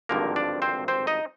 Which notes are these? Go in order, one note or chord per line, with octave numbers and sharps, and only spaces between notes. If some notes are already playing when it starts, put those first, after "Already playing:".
G#1 G2 D3 F3 A#3 A#4
D4 D5
C4 C5
C4 C5
D#4 D#5